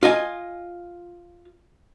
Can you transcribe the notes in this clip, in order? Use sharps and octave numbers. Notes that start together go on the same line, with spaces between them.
F4 D#5 G#5